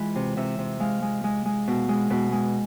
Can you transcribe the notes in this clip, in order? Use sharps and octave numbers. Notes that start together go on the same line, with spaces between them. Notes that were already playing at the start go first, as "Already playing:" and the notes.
Already playing: E3 G#3 F4 B4
C3
C3 E5
C3
G#3 F5
G#3
G#3
G#3
B2
G#3
B2 B4
G#3